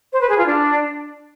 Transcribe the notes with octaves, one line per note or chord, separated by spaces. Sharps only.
C5
B4
G#4
F4
D4